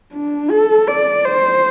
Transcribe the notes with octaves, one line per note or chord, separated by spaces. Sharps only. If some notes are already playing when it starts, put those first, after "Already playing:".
D4
A4
D5
C5